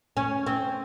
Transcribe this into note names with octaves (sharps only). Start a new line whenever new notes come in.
C#4
C4